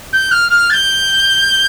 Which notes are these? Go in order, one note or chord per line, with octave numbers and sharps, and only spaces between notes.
G6
F6
F6
A6
G6